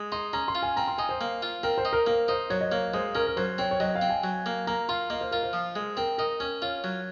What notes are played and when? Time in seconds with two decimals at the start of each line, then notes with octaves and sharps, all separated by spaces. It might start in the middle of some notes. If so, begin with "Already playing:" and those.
Already playing: G#3
0.12 D#4 C6
0.33 C#4 A#5
0.48 C6
0.55 F4
0.63 G#5
0.76 C4 A#5
0.88 C6
0.98 D#4 G#5
1.09 C5
1.21 A#3
1.42 F4
1.63 C4 A#4
1.78 C5
1.85 D#4
1.93 A#4
2.06 A#3 A#4
2.28 D#4 C5
2.50 F#3 C#5
2.61 D#5
2.71 A#3 C#5
2.94 G#3 C5
3.15 C#4 A#4
3.27 A#4
3.37 F#3 C5
3.58 C4 C#5
3.71 C#5
3.80 F#3 D#5
3.95 F5
4.01 C4
4.10 G#5
4.24 F#3
4.46 A#3
4.67 A#3 A#5
4.89 F4 C6
5.10 A#3 D#5
5.21 C5
5.31 F4 A#4
5.43 C5
5.53 F3
5.76 G#3
5.97 C4 A#4
6.18 D#4 A#4
6.40 C#4 A#4
6.62 F4 C#5
6.84 F#3